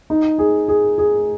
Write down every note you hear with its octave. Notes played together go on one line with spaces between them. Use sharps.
D#4
G#4
G#4
G#4